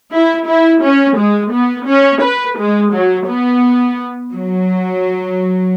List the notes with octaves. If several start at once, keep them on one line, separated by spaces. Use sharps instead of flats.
E4
E4
C#4
G#3
B3
C#4
B4
G#3
F#3
B3
F#3